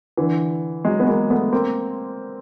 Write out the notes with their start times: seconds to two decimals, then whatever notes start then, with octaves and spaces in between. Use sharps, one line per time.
0.17 D3 E3
0.85 F#3 G#3
1.00 B3
1.07 G#3 A#3
1.30 A3 B3
1.52 A#3 C4